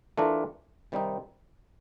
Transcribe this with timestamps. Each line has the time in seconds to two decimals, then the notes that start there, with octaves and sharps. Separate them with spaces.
0.17 E3 A3 D4 F4 A#4
0.92 C3 D#3 G3 C4 D#4